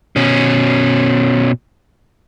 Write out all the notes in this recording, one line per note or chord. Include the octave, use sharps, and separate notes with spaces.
B2 C#4